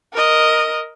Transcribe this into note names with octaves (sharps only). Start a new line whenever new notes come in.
A#4 D#5